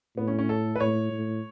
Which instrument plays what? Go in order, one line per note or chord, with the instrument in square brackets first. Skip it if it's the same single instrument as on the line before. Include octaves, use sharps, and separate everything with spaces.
[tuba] A2 [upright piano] B3
[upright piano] C#4
C#4
A4
B4
[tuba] A2 [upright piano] C#5
[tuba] A2